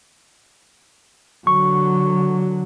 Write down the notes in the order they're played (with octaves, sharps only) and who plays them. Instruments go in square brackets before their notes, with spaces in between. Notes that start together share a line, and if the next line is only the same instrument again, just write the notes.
[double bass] D3 F#3 [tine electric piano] C#6